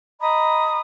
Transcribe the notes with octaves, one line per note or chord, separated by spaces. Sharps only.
D#5 A#5 B5 D#6